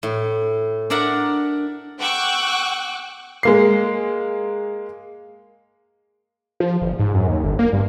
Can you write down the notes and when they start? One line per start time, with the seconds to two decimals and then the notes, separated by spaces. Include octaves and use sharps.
0.03 A2
0.90 D4 A#4 D5 E5 F#5 A#5
1.99 F#5 G5 C#6 D6 E6 F#6
3.43 G#3 A#3 C7
6.60 F3
6.82 G1
6.99 G#2
7.14 F#2
7.28 D#2
7.44 G1
7.59 A#3
7.73 G2